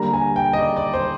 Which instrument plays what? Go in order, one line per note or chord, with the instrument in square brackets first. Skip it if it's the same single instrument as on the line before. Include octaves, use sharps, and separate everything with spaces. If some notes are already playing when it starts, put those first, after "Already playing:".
Already playing: [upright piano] D3 G3 A#3 D4 A#5
G#5
G5
D#5
D5
D5
C5